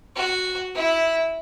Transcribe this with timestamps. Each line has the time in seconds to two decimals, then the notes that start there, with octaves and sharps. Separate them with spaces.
0.16 F#4
0.75 E4